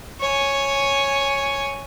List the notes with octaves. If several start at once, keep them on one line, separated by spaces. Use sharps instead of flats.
C#5 G#5